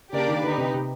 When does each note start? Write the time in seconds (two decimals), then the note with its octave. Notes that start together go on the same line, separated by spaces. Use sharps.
0.13 C#3 A#3 D4 G4 A#4 D5
0.28 D#3
0.43 D3 D#4 G4 B4
0.58 C3
0.74 C3